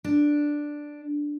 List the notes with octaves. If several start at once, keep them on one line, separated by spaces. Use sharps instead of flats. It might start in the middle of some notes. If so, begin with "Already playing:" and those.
D4